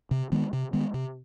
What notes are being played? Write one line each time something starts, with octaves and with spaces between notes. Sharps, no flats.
C3
D#3 G#3 B3
C3
D#3 G#3 B3
C3